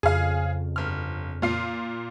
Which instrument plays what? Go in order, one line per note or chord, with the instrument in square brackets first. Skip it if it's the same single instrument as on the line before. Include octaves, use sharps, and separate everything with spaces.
[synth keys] F2 C#3 [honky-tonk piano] G#4 F5
[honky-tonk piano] G1 F6
A#2 F4 C7